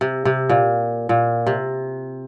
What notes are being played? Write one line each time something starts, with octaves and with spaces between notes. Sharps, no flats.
C3
C3
A#2
A#2
C3